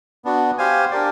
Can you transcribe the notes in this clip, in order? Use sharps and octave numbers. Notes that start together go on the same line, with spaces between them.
B3 D4 F#4
G4 C5 F5 G#5
D4 G4 A#4 D5